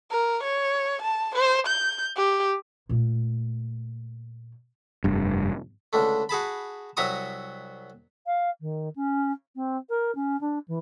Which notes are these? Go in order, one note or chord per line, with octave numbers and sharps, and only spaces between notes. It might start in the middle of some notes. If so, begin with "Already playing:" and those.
A#4
C#5
A5
C5
G6
G4
A#2 A3
F1 G2
C#2 D3 A3
F#4 G#4 A5 B5
C2 F#3 E5 A#5 C#6 D#6
F5
D#3
C#4
C4
A#4
C#4
D4
E3